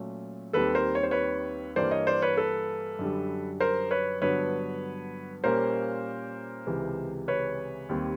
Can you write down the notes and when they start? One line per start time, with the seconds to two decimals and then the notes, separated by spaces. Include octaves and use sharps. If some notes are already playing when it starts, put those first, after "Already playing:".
Already playing: A#2 F#3 A3 C#4
0.53 D#2 D#3 G3 C4 A4 B4
0.75 A#4 C5
0.95 C#5
1.03 C5
1.11 B4 C#5
1.76 G2 E3 G3 A#3 C5 D5
1.91 C#5 D#5
2.07 C5 D5
2.22 B4 C#5
2.37 A4 B4
2.99 F#2 D3 G3
3.60 A#4 C5
3.91 B4 C#5
4.22 G2 D3 F#3 B3 B4 C#5
5.44 A#2 G3 A#3 C#4 A#4 C5
6.67 C#2 C3 E3
7.28 B4 C#5
7.89 D#2 D#3 G3 C4